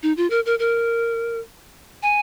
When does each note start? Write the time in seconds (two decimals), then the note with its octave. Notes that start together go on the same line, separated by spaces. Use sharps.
0.03 D#4
0.17 F4
0.30 A#4
0.46 A#4
0.59 A#4
2.03 G#5